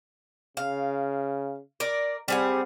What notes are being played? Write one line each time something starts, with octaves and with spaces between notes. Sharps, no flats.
C#3 F5
A#4 D5
G3 C4 G#4 F#5